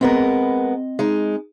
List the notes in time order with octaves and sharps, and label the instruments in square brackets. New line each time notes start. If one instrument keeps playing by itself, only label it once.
[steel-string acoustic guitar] G#3 B3 A#4 [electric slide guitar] C4 D#5
[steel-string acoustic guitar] G#3 D#4